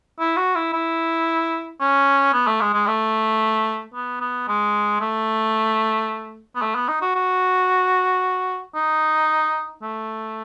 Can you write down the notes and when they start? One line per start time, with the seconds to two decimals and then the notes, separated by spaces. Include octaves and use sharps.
0.20 E4
0.37 F#4
0.55 E4
0.73 E4
1.80 C#4
2.33 B3
2.47 A3
2.61 G#3
2.74 G#3
2.87 A3
3.94 B3
4.20 B3
4.48 G#3
5.01 A3
6.55 B3
6.62 A3
6.75 B3
6.88 D#4
7.01 F#4
7.15 F#4
8.75 D#4
9.82 A3